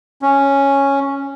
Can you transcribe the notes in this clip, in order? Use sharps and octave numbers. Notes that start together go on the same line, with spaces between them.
C#4